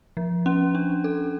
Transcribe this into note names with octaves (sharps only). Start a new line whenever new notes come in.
F3
C#4
D4
A4